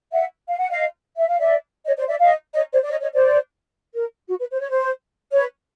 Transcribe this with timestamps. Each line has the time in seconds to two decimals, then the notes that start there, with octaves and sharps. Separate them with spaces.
0.12 E5 F#5
0.47 F5
0.58 F#5
0.70 D#5 F5
1.16 E5
1.27 F5
1.39 D5 E5
1.86 C#5 D#5
1.97 C5 D5
2.08 D5 E5
2.20 D#5 F5
2.54 C#5 D#5
2.72 C5 D5
2.82 D5
2.89 C#5 D#5
3.01 C#5 D#5
3.12 C5 D5
3.94 A#4
4.28 F#4
4.40 B4
4.52 C5
4.60 C#5
4.69 C5
5.32 B4 C#5